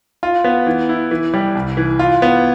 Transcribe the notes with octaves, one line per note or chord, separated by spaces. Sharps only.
F4
B3
E3
E4
E3
G3
C2
E3
F4
B3